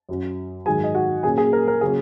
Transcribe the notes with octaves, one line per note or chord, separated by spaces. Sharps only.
F#2 F#3 C#4
G#2 D#3 F#3 G#4 G#5
D#5
F#4 F#5
A#2 F#3 A#3 C#4 G#4 G#5
G#4
A#4
A#4
C#3 F#3 A#3 C#4 G#4